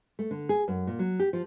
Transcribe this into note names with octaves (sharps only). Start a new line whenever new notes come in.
A3
D3
G#4
F#2
A#2
F#3
G4
F3